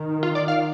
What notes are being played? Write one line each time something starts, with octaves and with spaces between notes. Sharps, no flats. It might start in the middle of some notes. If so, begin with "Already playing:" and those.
Already playing: D#3
F4
D5
F5